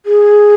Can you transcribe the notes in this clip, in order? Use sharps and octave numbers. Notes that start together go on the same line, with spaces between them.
G#4